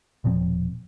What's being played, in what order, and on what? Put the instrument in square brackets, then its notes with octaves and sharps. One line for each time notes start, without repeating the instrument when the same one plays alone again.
[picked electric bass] E1 A#2 F3 C4